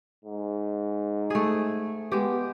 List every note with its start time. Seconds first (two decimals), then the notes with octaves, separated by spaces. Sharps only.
0.25 G#2
1.30 A3 G#4
2.12 G#3 B3 G4